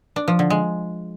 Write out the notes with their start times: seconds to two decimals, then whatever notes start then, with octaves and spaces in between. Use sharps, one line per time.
0.16 D4
0.28 F3
0.39 D3
0.50 G#3